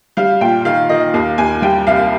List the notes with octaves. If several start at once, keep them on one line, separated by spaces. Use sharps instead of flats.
G3 F5
A#2 G5
D#3 F5
D#3 D#5
D#2 F5
D#2 G#5
G3 G5
C2 F5